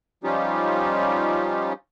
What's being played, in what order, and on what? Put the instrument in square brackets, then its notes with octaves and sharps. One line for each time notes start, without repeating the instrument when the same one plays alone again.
[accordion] F3 G3 C#4 D#4 F4 G4